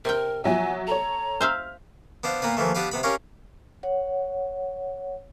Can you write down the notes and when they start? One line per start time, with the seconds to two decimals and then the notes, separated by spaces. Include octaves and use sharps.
0.05 C3 A#4 G5
0.44 F3 F#3 E5 G#5
0.87 A4 C#5 A#5
1.41 C5 E5 F5 F6
2.24 B3 D4 C5 F5
2.42 A#2 A#3 B3 B4
2.57 D#2 E3 F3 A3
2.75 B3 D4 G4 B4 F5
2.91 C3 B3 B5
3.03 C#4 G4 A#4 C#5 F5
3.83 C#5 F#5